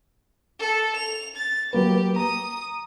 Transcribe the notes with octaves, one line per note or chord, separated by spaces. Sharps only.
A4
F7
A6
F#3 A#3 G4 B4
A#5 D#6